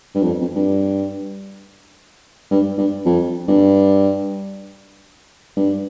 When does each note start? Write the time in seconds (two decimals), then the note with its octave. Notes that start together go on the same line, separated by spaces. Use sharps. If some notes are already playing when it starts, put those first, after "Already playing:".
0.15 G2
0.23 F2
0.41 F2
0.56 G2
2.51 G2
2.78 G2
3.05 F2
3.48 G2
5.56 G2